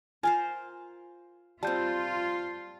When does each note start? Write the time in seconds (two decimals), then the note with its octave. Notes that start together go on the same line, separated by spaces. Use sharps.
0.23 F4 A#4 C5 G#5
1.63 G3 C4 F4 A5 G6